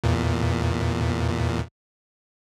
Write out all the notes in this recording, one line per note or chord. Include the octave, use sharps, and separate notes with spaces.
E2 A#2